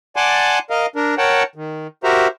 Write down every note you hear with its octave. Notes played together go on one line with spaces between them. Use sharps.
D5 F#5 G#5 A5 C6 D6
A#4 D#5 F5
D4 A#4
A#4 C#5 F#5 G5 A5
D#3
F#4 G4 A#4 C5 E5 A#5